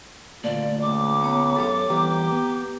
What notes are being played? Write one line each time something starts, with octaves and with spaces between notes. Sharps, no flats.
D2 A#2 A3 F4 D5
C#2 D6
B3 C#5 A#5
F#2 G4 A4 C#5 B5
E3 G3 B3 G4 A#5
B3